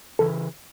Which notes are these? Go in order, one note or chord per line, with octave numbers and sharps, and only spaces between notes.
C#3 E3 A4